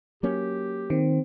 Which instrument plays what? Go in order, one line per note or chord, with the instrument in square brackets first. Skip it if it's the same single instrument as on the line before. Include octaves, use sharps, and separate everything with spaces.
[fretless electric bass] F#3 A#3 C#4 [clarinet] G4
[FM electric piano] D#3 [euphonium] C4